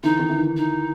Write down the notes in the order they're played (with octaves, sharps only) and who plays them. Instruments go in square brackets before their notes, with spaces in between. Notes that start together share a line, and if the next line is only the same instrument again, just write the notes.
[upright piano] D3 E3 [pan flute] D#4
[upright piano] D#3
D3 E3
[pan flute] D#4